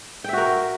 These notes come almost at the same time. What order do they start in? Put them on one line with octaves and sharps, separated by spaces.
G5 E5 F#4 A#4